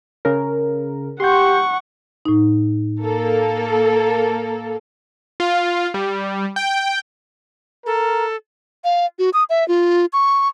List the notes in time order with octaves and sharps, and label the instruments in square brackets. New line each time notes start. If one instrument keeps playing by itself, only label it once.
[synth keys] C#3 A#4
[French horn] G4 [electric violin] F#5 C#6 [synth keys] C6 G6
[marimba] A2 D#4
[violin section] A#3 A4
[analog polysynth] F4
G3
G5
[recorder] A4 [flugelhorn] A#4
[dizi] F5
F#4
D#6
E5
F4
C#6